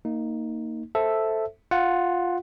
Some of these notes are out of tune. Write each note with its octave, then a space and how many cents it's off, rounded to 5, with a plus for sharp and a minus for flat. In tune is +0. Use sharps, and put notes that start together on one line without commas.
A#3 -20 D#4 +5
A4 +0 C5 +0 E5 +0
F4 +10 F#5 +0